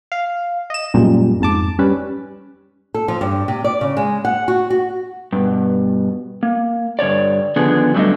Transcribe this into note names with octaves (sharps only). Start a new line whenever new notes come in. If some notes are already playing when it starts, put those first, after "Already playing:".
F5
D#5 E7
F#2 A#2 G3 G#3
F2 G#2 A5 D6
G3 C#4 B4
A4
F3
G2
C3
D5
C#3
G#3
F#5
F#4
F#4
G2 B2
A#3
G2 D3 C#5 D5
D3 D#3 F3 B3 D4 G#4
F#3 G3 A3 A#3 D4 D#5